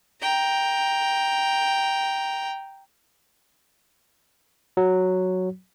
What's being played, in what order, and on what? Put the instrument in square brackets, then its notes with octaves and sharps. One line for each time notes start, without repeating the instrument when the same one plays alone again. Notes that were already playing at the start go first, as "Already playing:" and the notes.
[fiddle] G5 A#5
[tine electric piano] F#3